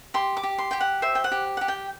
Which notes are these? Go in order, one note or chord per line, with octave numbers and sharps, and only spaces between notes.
G4 C6
D6
G4
C6
G4 G5
F#5
C5 E5
G5
F#5
G4
G4 F#5
G5